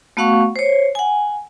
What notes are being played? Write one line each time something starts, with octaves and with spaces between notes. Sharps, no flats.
A3 B3 F#4 F5 F#5 C#6
C5 C#5
F#5 G#5